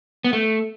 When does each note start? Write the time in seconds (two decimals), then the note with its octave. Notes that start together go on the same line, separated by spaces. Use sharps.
0.24 B3
0.33 A3